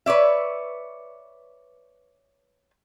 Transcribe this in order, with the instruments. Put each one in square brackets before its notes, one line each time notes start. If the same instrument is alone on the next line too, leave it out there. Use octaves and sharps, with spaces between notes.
[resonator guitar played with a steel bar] B4 C#5 D5 E5